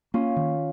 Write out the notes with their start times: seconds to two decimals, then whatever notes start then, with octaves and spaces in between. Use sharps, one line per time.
0.14 A#3 C#4 F4
0.37 D#3